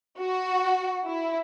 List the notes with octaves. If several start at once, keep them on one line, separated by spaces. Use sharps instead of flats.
F#4
E4